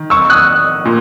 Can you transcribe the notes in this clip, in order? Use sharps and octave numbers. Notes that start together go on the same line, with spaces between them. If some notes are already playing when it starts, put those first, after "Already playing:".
Already playing: D#3
C#6 E6
D#6 F#6
A#2